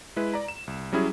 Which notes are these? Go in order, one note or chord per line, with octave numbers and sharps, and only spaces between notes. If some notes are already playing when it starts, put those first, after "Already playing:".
G#3 E4 B4
D5 A#5
E7
C2
F#3 G3 C#4 E4 G#4